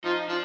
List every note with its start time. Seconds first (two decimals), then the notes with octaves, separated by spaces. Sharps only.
0.04 F3 D#4
0.28 F3 D4